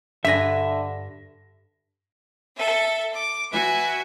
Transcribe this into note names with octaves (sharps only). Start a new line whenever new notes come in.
G2 D3 B4 E5 G#5 A#6 B6
A4 E5
D6
F#4 B4 E5 G#5